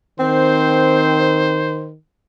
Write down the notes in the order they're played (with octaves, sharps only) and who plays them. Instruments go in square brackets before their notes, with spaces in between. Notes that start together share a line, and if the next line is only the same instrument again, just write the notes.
[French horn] D#3 [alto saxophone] C4 [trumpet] C5